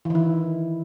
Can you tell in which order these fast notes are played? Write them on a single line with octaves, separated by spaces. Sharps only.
E3 D#3 E4